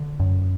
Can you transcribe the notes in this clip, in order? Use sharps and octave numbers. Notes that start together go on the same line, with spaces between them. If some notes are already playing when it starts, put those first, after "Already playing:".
Already playing: D3
F#2